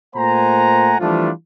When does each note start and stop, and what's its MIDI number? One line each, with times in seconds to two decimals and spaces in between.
0.16 0.96 46
0.16 0.96 57
0.16 0.96 72
0.16 0.96 78
0.16 0.96 80
0.16 0.96 82
1.00 1.30 52
1.00 1.30 53
1.00 1.30 55
1.00 1.30 57
1.00 1.30 62
1.00 1.30 65